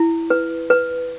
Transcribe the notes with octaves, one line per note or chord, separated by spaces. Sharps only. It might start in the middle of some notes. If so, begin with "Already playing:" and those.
Already playing: E4
B4
B4